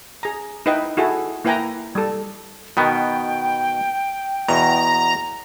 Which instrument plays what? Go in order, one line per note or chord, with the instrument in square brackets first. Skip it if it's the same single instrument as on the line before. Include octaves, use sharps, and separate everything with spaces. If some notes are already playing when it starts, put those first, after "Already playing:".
[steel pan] G#4 A#5
D#4 E4 B4 D#5 G5
E4 F#4 G#4 A4
A#3 E4 B4 G5 G#5 A#5
G3 A4
[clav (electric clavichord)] B2 D#3 B3 [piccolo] G5
[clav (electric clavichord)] E2 B2 [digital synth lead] A#5